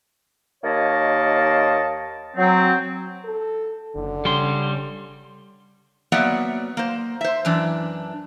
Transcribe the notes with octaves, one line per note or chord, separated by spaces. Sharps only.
D#2 A#3 C#5 D#5 A5
F#3 C4
A4
F#1 D3
C#3 G3 C6
F#3 A#3 B3 D5 E5 F#5
A#3 C5
C5 E5
F#2 E3 D4